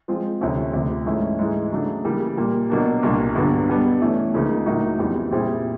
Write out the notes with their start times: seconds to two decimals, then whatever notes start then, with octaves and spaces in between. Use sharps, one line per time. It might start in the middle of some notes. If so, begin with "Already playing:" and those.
0.08 F3 G#3 C4 F4
0.41 D2 C3 F3 A3 C#4
0.73 D2 C3 F3
1.06 G#2 E3 A3 C#4 E4
1.39 G#2 E3 G#3
1.72 C#3 F#3 A3 D4
2.04 C#3 E3 G3 A#3
2.37 A#2 G3 A#3
2.70 B2 F#3 A#3 D4
3.03 C2 A#2 G3 A#3 D4
3.35 G2 D3 F#3 B3 D4
3.68 B2 G3 B3 D4
4.01 E3 A3 C#4
4.34 C#2 C#3 F3 A#3 D#4
4.66 A2 F#3 A#3 D#4 F#4
4.98 F2 C#3 E3 G3 B3
5.31 A#2 G3 C4 E4 G#4